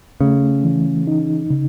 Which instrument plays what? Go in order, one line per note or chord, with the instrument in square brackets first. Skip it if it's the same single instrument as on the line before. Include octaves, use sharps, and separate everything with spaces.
[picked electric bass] C#3 [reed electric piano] A3
[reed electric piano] E3
D#4
C#3